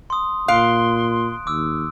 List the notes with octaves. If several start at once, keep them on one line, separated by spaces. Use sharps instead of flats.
C6 D#6
A#2 F5 C6 F#6 D7
D#2 D6 E6